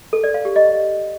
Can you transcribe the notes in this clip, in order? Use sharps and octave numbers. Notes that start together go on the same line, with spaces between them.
A4
D5
F5
G4
D#5